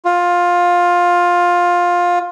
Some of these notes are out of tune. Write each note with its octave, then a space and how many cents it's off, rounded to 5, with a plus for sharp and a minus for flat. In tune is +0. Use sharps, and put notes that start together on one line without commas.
F4 +15